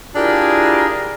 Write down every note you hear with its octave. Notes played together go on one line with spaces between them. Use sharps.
D4 E4 F4 G4 G#4 A#4